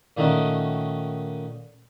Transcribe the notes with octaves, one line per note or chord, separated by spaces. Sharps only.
A#2 D#3 A3 C#4 D#4 F#4